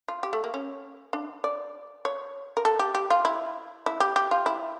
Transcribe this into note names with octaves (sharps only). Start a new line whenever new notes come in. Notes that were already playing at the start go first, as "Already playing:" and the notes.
F4
G4
A3
A#3
C#4
D4
D5
C#5
A#4
A4
G4
G4
F4
E4
E4
G4
G4
F4
E4